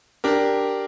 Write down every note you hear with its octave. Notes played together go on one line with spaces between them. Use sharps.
D4 G4 A#4